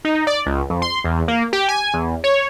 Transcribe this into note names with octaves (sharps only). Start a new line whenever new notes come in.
D#4
D5
C#2
F2
C6
E2
A#3
G4
G#5
E2
C#5